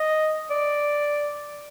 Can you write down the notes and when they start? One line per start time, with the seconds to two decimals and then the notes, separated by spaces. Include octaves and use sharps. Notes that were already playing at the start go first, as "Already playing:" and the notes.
Already playing: D#5
0.51 D5